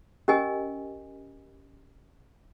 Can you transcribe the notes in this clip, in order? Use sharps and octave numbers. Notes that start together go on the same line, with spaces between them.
C#4 G4 A#4 D#5 G#5